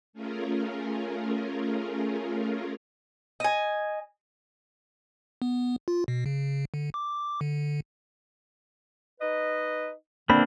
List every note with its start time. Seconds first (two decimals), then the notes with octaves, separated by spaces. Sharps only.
0.13 A3 C#4 F4 G#4 A#4
3.40 D#5 G#5
5.42 B3
5.88 F4
6.08 B2
6.26 C#3
6.74 D3
6.94 D6
7.41 D3
9.20 D#4 B4 D#5
10.30 E2 A#2 D3 A#3 C4 D4 B5